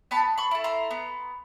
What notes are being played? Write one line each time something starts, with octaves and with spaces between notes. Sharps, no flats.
B3 A5 B5
B5 C#6
E4 A4
A#5 C6
B3